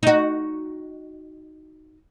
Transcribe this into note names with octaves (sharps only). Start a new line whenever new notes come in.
D#4 F#4